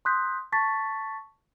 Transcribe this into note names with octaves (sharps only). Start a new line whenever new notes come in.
C6 D#6 F#6 G6 B6
A5 C#6 A6 B6